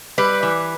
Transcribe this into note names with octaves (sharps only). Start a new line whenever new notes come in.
G3 B4
E3